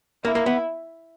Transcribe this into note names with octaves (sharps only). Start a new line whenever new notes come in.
A#3 E4
A#3
B3